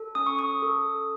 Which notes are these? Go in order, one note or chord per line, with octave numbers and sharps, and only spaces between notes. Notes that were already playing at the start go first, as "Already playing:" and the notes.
Already playing: A4
C#4 D#6
C#6
D#6
A4